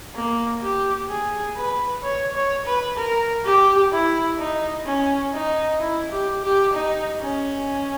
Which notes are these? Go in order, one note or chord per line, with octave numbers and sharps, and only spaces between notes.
A#3
G4
G#4
B4
C#5
C#5
B4
A#4
G4
E4
D#4
C#4
D#4
E4
G4
G4
D#4
C#4